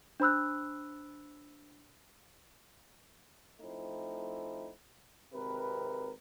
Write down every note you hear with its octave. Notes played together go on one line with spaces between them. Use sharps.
D4 C5 B5 E6 F#6
F3 A3 C4 D#4 E4
G#1 C3 A#4 B4